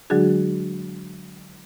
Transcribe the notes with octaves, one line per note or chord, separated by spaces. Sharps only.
D3 F#3 G#3 D4 F#4 G#4